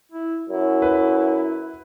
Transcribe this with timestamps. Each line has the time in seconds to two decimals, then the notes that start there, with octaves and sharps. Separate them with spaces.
0.12 E4
0.49 F#2 E4
0.82 B4